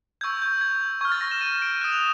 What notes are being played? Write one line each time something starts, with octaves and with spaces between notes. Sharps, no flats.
C#6 E6 G6 G#6
G6
G#6
C#6 F6 G#6
A6
A#6
E7
D#7
D7
D#6 F#6 E7
F7